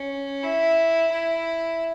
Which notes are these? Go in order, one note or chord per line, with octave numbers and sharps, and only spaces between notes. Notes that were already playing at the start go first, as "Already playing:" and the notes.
Already playing: C#4
E4
E4